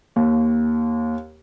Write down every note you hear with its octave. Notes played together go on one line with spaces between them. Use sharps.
D#2